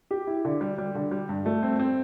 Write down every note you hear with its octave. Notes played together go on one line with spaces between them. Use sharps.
G4
E4
D3
G3
G3
D3
G3
G2
A3
C4
C4